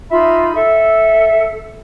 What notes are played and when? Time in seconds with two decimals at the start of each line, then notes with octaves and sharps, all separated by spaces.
0.11 D#4 F4 E5 B5
0.55 A4 E5